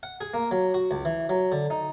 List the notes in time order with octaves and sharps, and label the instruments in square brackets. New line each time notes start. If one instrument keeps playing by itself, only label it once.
[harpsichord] F#5
G#4
A#3
F#3
F#4
C#2
E3
F#3
D3
D#4